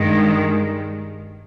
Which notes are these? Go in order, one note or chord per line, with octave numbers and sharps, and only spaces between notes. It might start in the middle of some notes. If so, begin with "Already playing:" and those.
Already playing: G2 D#3 G#3